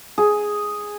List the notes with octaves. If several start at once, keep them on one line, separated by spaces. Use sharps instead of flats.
G#4